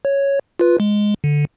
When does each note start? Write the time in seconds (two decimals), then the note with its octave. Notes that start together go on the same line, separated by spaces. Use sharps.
0.05 C#5
0.60 F4 B4
0.80 G#3
1.24 D3